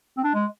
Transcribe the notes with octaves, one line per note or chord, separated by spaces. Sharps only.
C4
D4
G#3